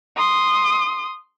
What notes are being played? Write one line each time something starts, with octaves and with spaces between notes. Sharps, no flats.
C6 D#6